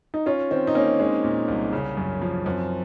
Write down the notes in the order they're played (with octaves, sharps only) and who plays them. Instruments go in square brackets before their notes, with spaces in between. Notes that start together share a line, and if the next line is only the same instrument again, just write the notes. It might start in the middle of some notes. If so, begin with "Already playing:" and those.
[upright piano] D#4
[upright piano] C#4 [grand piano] F4
[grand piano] D#3 [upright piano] C4
[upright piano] D#4
[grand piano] A#3 [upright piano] C#4
[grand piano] G#3 [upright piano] C#4
[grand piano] A#2
C2
C#3
F#2
F3
[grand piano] F#2 [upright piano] C4